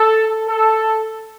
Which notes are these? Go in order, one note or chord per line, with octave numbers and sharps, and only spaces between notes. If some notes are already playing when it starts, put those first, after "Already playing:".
Already playing: A4
A4